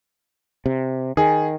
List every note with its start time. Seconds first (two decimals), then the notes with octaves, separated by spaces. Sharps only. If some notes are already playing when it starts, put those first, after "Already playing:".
0.66 C3
1.17 D#3 G#4